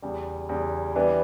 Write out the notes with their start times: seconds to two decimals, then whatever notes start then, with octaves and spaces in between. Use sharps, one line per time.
0.02 E2 C#3 G3
0.49 E2 C#3 G3
0.95 E3 G3 B3 D4